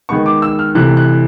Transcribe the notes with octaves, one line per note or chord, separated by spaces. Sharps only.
D#3 G#3 B3 C#6
D6
E6
F6
C3 E3 A3 F#6
F#6